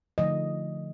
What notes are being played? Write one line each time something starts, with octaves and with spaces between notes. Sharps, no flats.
D3 F3 A3 D#5